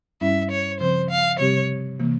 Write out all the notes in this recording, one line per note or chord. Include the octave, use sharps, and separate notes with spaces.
G2 G3 C#4 E4 E5
C#5
C#3 F3 C4 C5
F5
C3 G3 C4 G4 C#5
C3 E3 A#3